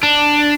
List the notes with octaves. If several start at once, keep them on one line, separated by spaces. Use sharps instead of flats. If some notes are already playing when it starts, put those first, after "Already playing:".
D4